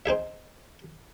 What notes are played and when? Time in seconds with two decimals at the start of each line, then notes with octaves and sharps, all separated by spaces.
0.06 C4 D#4 G#4 E5